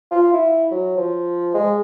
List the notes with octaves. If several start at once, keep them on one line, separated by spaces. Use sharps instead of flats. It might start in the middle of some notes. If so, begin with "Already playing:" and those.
F4
E4
F#3
F3
G#3